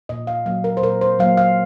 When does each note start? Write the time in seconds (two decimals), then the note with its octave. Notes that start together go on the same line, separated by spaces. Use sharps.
0.09 A#2 D#5
0.27 F5
0.46 F#3 A#3 F5
0.64 A#4
0.77 C5
0.82 A#2 A#4
1.01 C5
1.19 F#3 A#3 F5
1.37 F5